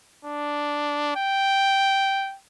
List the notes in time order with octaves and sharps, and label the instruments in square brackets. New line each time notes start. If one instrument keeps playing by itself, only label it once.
[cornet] D4
G5